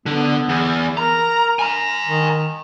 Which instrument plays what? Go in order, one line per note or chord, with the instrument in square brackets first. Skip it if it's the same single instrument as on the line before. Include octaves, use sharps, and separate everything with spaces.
[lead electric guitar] D3 [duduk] B3
[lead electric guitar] E2
[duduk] A#4 [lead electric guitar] A#5
[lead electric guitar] G#5 A#5
[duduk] D#3